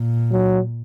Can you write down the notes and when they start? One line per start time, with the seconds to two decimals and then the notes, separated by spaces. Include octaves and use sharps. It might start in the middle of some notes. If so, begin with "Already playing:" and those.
Already playing: A#2
0.32 F#3